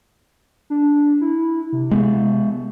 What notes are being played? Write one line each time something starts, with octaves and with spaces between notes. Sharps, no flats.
D4
E4
C3
G#3 B3